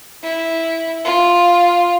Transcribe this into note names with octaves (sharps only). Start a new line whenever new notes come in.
E4
F4